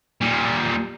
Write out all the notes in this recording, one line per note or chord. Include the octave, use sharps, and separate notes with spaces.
A#2 G3